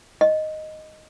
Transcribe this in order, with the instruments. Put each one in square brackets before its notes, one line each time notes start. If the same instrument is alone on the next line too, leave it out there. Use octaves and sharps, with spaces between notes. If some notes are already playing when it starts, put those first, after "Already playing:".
[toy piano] D#5